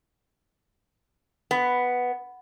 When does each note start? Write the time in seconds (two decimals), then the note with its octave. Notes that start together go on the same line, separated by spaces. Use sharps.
1.51 B3